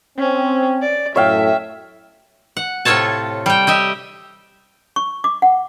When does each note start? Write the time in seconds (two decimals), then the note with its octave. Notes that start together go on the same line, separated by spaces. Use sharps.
0.18 C4 C#4
0.82 D5
1.16 F#2 A2 C#5 E5 F5 G5
2.57 F#5
2.85 A2 C3 F4 A4 C#5 A5
3.46 G3 G5
3.67 G4 D#5 E5
4.96 C#6
5.24 D6
5.42 F#5